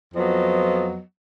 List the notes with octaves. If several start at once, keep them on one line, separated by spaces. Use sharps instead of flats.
F2 F3 F#3 B3 D#5